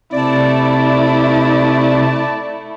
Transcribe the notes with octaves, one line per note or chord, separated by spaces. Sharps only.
C3 A3 E4 D5 A5